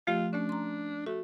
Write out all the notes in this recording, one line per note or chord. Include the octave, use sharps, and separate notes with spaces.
F3 A3 F4 G4
A3 C#4 D4
A#5 C6
A3 F#4